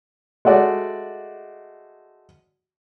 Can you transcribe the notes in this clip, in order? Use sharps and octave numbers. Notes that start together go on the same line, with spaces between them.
G#3 A3 F#4 D5